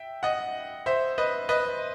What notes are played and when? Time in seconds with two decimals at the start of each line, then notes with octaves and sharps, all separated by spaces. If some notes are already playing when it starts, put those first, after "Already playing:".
Already playing: E5 G5
0.23 D#5 F#5
0.86 C5 E5
1.18 B4 D#5
1.49 B4 D#5